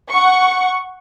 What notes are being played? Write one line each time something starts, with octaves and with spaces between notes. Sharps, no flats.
F#5 C#6